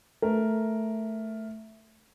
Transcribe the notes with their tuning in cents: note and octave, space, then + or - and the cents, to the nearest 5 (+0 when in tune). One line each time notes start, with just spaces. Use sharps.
A3 +0 A#4 +0